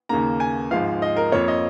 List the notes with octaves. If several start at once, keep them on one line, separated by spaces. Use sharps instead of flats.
D#2 C#3 A#3 A#5
G#5
G#1 G#2 F3 F5
D#5
A#4
F2 F3 A#3 C#5
D#5